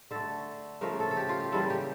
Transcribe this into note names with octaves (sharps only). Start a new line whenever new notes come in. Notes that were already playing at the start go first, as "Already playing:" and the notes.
D3 A3 A4
C#3 F3 A3 A#4
A4
A4
G4
F4
G4
C#3 E3 G3 A#3 A4
G4